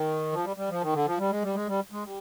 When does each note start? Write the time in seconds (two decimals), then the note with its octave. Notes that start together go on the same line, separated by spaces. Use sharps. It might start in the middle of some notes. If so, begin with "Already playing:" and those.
Already playing: D#3
0.32 F3
0.44 G3
0.57 G3
0.69 F3
0.81 D#3
0.93 D3
1.06 F3
1.18 G3
1.30 G#3
1.43 G3
1.54 G#3
1.67 G3
1.92 G#3
2.04 G3